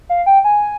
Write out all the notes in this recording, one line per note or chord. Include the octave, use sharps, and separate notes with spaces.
F5
G5
G#5